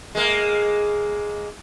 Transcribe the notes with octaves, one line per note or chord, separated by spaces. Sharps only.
G#3 A#3